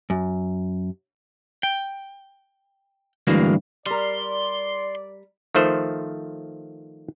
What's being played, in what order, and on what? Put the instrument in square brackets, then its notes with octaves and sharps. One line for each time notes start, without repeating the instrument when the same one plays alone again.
[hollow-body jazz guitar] F#2
[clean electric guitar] G5
D2 G2 E3 G#3 A#3 F#4
[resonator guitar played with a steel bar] G3 A#4 [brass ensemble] D5 [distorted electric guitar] C6
[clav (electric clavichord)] D#3 F3 A3 C5